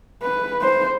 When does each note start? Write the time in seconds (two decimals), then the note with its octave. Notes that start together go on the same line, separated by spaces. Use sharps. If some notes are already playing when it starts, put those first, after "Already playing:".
0.23 B4
0.62 C5